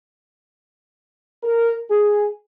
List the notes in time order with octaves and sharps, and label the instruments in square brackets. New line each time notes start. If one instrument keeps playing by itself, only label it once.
[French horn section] A#4
G#4